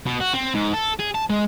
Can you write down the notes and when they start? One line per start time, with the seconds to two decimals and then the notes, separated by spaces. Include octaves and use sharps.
0.07 B2
0.21 F#4
0.34 C4
0.55 G#2
0.74 A4
1.00 G#4
1.15 A5
1.30 G#3